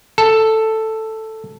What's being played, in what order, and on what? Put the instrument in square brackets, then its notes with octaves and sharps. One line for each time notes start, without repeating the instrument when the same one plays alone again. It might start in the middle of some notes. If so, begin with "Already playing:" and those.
[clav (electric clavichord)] A4